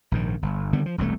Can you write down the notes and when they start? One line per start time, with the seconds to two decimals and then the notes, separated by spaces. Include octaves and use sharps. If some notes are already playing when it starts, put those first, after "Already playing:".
0.12 A#1 G#2 D#3
0.42 G1
0.73 D3 D#3 G3 B3
0.86 F3
0.98 E1 C2 C3 A3